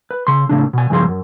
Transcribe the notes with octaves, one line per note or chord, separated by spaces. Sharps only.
B4
C#3 C6
A2 C#3 D4
B2 G#5
C#2 G2 F3 G#4 C6
F#2